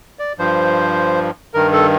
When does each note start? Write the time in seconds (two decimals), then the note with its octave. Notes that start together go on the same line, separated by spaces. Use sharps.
0.19 D5
0.38 G2 F3 C5
1.54 G2 D#3 A#4
1.73 A4